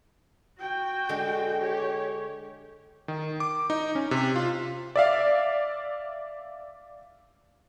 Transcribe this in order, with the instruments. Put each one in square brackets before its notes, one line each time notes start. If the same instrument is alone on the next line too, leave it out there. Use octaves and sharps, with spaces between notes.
[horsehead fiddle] F#4 G5
[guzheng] D3 G#3
[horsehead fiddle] G4 C#5
[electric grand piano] D#3
D6
D#4
C#4
C3
F4
D5 E5 F5